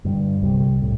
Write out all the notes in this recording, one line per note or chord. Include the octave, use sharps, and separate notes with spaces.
G2 D3 G3
C2 C3 G3
A2